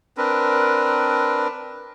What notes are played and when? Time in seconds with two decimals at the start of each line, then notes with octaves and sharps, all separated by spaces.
0.17 C4 D4 A#4 B4